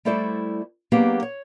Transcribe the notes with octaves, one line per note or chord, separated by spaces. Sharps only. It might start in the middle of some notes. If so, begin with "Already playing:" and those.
G3 A3 E4 A4 C5 D5
F#3 A#3 B3 D4 G4 G#4
C#5